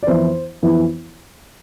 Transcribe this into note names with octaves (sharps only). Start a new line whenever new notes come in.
D5
F2 E3 B3 E4 C5
F2 E3 B3 E4